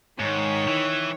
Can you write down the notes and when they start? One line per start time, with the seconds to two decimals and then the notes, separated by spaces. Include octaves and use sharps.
0.20 G#2 D#3 C#5
0.68 E3